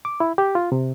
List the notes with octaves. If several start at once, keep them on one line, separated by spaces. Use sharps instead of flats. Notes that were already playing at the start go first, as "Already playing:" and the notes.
D6
E4
G4
F4
C3